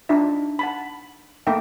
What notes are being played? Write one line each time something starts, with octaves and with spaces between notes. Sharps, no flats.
D4 D#4 F4 E5
F#5 A5 B5
A3 A#3 D#4 E5 G5